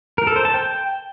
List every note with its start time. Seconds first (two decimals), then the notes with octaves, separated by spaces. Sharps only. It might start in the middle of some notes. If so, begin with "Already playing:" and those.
0.18 A#4
0.27 A4
0.36 C5
0.45 A5
0.54 G5